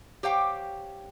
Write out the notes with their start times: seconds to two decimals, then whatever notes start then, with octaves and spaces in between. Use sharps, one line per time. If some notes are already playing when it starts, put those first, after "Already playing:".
0.23 G4 C5 C#5 F5 G5